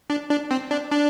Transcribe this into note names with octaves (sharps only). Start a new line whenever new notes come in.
D4
D4
C4
D4
D4